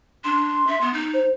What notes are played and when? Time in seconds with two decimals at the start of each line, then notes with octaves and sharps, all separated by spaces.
0.24 D4 C6
0.67 E5
0.82 B3
0.94 D#4
1.14 C5